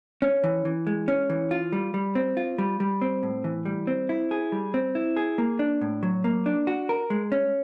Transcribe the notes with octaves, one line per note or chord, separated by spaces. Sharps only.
C#4
E3
E3
G#3
C#4
E3
F4
G3
G3
C4
F4
G3
G3
C4
A2
E3
G3
C4
E4
G#4
G3
C4
E4
G#4
A#3
D4
A2
F#3
A#3
D4
F#4
A#4
G#3
C#4